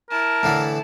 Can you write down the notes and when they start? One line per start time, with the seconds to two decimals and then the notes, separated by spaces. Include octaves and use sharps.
0.11 E4 A#4 A5
0.43 A2 D3 E3